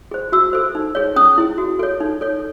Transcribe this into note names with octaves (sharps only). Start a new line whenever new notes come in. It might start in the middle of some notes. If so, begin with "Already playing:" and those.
G#4 C5
F#4 E6
A4 C5
D#4
G#4 C#5
C#4 D#6
E4 G#4
F#4
A4 C#5
D#4
A4 C#5